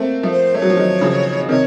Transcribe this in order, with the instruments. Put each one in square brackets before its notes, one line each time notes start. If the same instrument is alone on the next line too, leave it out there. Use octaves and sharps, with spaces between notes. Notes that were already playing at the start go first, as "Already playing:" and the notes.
Already playing: [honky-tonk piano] A3 A#3 C4
F3 A3
[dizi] C5
[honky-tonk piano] A3 [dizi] C#5
[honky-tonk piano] F#3
F3
D#3 F#3
C#3 F3
[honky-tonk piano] C3 D#3 [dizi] C#5